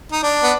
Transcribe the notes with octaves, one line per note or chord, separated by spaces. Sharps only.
D#4
D4
B3